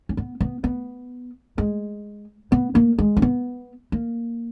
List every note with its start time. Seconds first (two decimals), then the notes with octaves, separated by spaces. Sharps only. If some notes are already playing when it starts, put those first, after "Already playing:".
0.09 C#4
0.17 B3
0.41 B3
0.64 B3
1.58 G#3
2.52 B3
2.75 A#3
2.99 G#3
3.17 C#4
3.22 B3
3.92 A#3